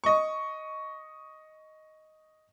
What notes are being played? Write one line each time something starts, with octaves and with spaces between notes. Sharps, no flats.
D#5 C#6